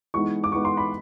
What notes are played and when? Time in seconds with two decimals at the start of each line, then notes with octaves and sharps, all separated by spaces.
0.14 E3 G#3 B3 D#4 C#6
0.44 D6
0.52 E3 G#3 B3 D#4 C#6
0.65 C6
0.77 B5